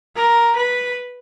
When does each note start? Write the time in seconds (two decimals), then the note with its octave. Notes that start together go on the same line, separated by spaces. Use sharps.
0.16 A#4
0.56 B4